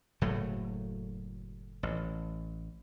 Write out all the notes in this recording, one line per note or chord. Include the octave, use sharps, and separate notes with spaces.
F#1 A2 F#3 A3
A1